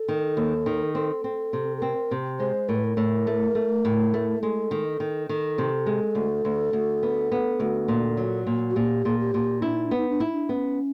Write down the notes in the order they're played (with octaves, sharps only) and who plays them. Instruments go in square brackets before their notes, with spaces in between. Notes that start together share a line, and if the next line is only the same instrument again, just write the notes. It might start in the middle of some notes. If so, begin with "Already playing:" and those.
Already playing: [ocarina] A4
[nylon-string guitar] D#3
D#2
D#3
[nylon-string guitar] C4 [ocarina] A4
[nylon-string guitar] C4
C3
[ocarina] A4
[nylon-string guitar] C4 [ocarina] A#4
[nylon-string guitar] C3
[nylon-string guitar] G#3 [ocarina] C5
[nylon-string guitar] A2 [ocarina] A#4
[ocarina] B4
A#4
[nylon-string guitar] A2
A3
A3
A2
A3
[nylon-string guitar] G#3 [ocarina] A4
[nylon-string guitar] D#3
D#3
[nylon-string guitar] D#3 [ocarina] A4
[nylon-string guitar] C3
G#3
D2
D2
D2
B3
B3
D2
A#2
F#3
A#2
[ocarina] F#4
[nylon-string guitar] A#2 [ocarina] G4
[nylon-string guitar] A#2 [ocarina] G#4
[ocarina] G4
[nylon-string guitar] A#2
[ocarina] D4 [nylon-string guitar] E4
[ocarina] D#4
D4
[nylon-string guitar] B3
[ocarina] D#4
D4
[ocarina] D#4 [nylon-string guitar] E4
[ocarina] D4
[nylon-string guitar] B3 [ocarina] C#4